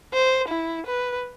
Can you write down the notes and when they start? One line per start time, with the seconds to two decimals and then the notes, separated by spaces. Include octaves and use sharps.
0.13 C5
0.48 E4
0.87 B4